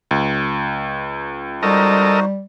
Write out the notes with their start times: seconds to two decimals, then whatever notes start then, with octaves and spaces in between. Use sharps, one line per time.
0.11 C#2
1.63 G3 D#4 F#4 A4 A#4 C5 D#5